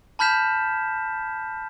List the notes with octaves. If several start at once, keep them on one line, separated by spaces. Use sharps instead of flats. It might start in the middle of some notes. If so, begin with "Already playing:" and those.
A5 B5 F6 G6 B6 E7